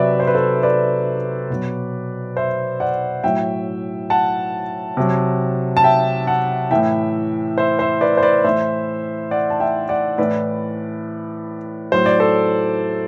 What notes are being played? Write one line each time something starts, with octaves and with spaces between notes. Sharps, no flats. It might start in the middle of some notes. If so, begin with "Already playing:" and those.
Already playing: C3 F#3 B4 D5 E5
C5
B4
A4 C5
B4 D5
B2 F#3
C5 E5
D5 F#5
A2 F#3 E5 G5
F#5 A5
C3 F#3
A5
E5 G5
F#5 A5
A2 E3 E5 G5
C5 E5
C5 E5
B4 D5
C5
B4 D5
A2 E3 C5 E5
D5 F#5
A5
E5 G5
D5 F#5
A2 E3 B4 D5
A2 F#3 C5
D5
A4 C5